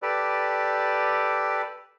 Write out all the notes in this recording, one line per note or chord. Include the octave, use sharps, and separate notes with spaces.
G4 A4 B4 D5